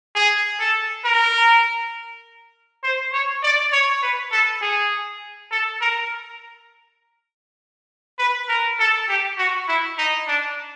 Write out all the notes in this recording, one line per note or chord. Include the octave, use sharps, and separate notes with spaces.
G#4
A4
A#4
C5
C#5
D5
C#5
B4
A4
G#4
A4
A#4
B4
A#4
A4
G4
F#4
E4
D#4
D4